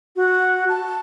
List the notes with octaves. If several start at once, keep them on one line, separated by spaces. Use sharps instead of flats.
F#4
A5